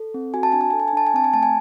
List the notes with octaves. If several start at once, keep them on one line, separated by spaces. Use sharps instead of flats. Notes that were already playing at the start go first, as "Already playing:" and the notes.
Already playing: A4
C4
F#4 G#5
A5
D4 G#5
A5
A4 G#5
A5
G#5
D4 A5
G#5
C4 A5
G#5
A3 A5
G#5